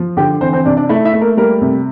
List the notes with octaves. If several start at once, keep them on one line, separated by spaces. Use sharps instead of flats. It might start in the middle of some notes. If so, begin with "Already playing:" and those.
Already playing: F3
D3 G4 G5
E3 C4 C5
C4 C5
C3 D4 D5
D4 D5
A3 E4 E5
E4 E5
A3
A#3 A#4
G3 A#3 A#4
C3